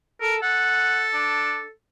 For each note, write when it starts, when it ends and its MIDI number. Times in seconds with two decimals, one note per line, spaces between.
0.21 0.39 69
0.21 0.35 70
0.42 1.70 69
0.42 1.04 78
1.14 1.61 62